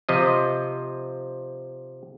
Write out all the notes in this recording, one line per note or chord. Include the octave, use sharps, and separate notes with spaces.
C3 F3 D#5